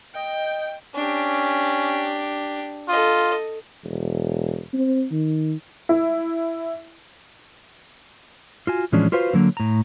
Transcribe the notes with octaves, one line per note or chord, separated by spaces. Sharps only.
D#5 G5
C#4 D4 G4
F4 A4 D#5
E1
C4
D#3
E4
F4 F#4 G#5
A2 E3 F3 G#3 C#4 D4
F4 F#4 B4 C5 F5
D3 F#3 A#3
A2 A#5